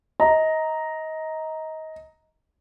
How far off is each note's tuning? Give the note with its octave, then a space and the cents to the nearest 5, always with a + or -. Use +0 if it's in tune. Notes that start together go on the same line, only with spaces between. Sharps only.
D#5 +25 A#5 +0